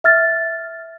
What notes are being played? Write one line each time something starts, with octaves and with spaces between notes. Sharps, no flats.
E5 F6 A6